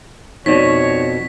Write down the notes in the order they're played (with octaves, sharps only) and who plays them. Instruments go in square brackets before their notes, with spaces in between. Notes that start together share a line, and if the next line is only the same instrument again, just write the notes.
[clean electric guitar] F2 B2 [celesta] D#4 D5 [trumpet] C#5 [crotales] B6